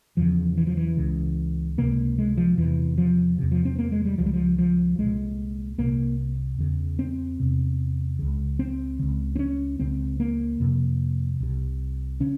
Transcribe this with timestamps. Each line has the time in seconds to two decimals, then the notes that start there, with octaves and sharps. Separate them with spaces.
0.17 E2 C#3 F3
0.58 E3
0.67 F3
0.77 E3
0.97 C#2 C#3
1.78 C#2 C3 A#3
2.18 G#3
2.37 F3
2.58 E2 C3 E3
2.98 F3
3.38 E2 C3
3.52 F3
3.65 C4
3.79 A#3
3.92 G#3
4.05 G3
4.18 C#2 C#3 F3
4.26 G3
4.33 F3
4.59 F3
4.99 C2 A#2 G#3
5.78 C2 C3 A#3
6.58 E2 C#3
6.99 C4
7.40 E2 C3
8.19 C#2 C#3
8.59 C4
8.99 C#2 C#3
9.36 C4
9.39 C#4
9.79 C#2 C#3 C4
10.20 A#3
10.60 F2 C3
11.40 C2 C3
12.20 C#3 C#4